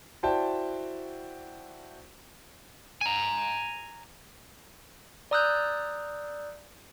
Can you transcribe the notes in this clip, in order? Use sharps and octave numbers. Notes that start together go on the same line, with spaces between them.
E4 F#4 C5 D5 G5 A5
G#5 A#5
D5 A#5 D#6 E6 F#6 G6